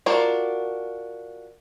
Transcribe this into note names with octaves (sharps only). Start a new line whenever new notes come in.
D4 F4 F#4 A#4